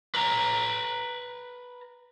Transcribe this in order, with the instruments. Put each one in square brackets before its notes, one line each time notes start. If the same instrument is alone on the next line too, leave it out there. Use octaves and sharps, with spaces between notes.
[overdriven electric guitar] B4 A#5